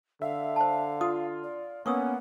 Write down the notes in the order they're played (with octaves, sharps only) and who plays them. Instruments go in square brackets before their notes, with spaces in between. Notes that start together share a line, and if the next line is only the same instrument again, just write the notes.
[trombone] D3 [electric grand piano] E5 [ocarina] F5
[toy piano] C5 A5
[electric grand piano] F4 [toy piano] D#6
[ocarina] D5
[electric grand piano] A#3 B3 [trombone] C#4 [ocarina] F#5 [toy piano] C#6 D#6 E6